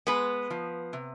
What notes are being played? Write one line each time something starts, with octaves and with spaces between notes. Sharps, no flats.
G#3 B3 B4
F3
C3